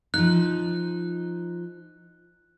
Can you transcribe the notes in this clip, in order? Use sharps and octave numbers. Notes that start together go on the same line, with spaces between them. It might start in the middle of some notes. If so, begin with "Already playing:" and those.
F3 D#4 F#6